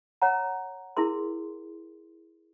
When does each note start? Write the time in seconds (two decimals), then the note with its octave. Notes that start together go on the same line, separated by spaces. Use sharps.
0.22 C#5 F#5 A#5
0.97 E4 G#4 A#4 C6